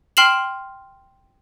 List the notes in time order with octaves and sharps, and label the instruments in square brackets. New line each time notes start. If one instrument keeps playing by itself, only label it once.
[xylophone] G5 C6 F6 C7 E7 F#7